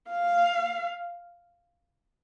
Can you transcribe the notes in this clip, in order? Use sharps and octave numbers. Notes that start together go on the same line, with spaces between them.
F5